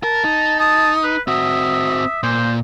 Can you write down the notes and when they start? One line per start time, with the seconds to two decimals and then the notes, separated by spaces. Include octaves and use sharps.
0.03 A#4 A5
0.24 D#4
0.60 A5 D#6
1.04 B4
1.28 C4 F#4 E5 D#6
2.23 A#2 C5